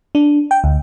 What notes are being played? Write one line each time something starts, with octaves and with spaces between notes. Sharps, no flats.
D4
G5
D2